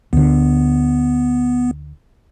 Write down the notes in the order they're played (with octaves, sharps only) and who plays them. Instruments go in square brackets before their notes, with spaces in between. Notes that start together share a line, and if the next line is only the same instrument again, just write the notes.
[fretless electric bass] D2 D3 [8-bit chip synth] B3